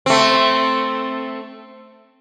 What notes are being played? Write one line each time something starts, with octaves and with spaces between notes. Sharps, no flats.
A3 C4